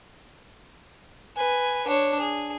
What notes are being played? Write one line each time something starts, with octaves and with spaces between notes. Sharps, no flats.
B4 G#5
D4 C#5
G#4